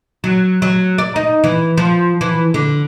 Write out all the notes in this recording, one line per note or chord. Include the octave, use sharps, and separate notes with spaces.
F#3
F#3
D5
D#4
E3
F3
E3
D3